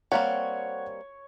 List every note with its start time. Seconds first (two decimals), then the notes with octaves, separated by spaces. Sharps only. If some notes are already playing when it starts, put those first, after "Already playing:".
0.12 G3 A#3 C4 C#5 F#5